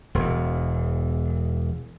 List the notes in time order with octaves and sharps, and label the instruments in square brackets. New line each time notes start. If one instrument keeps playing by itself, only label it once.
[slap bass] E1 E2